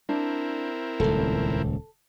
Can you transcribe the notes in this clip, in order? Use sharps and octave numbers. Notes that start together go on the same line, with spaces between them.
C4 D4 E4 A#4
D#1 C#2 A4